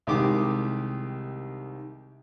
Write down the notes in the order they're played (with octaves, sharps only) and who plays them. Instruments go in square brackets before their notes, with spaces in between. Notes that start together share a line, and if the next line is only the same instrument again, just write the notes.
[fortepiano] C2 D#3 G#3 G4 D6 D#6